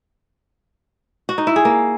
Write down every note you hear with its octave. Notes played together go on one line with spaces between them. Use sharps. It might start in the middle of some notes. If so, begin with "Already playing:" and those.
F#4
D#4
E4
G#4
A#3